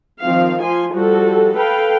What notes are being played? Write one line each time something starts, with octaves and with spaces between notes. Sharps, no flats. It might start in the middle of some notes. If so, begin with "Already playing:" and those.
D#3 F3 C4 F5
F3 F4 G#5 C6
F3 G3 F#4 A4
A4 B4 F5 G5